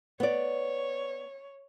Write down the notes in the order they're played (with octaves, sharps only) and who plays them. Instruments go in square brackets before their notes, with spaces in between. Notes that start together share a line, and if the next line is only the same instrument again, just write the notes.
[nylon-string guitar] B3 D5 [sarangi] C#5